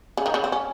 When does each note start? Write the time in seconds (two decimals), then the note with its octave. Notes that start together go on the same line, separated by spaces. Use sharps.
0.17 C#3
0.26 D#3
0.34 C#3
0.44 C4
0.52 C#4